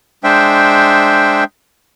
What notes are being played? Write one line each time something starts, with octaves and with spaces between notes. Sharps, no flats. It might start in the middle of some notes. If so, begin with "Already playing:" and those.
G#3 D4 C5 E5 G5